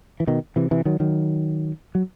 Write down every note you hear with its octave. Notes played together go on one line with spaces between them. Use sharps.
E3
B2 D#3
C3 E3
C3 E3
D#3 F#3
D#3 F#3
F#3